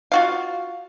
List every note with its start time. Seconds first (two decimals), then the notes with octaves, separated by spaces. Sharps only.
0.12 F4 F#4 F5